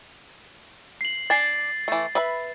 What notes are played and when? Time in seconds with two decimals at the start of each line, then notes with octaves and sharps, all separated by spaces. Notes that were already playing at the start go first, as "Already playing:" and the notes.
1.01 C7 F#7
1.30 D4 G#5 A6 C7
1.88 E3 A3
2.15 B4 E5 B5